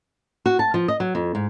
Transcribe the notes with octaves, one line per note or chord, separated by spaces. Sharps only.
F#4
A5
F3
D#5
F#3
F2
G#2